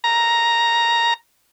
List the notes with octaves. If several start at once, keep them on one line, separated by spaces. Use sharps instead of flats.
A#5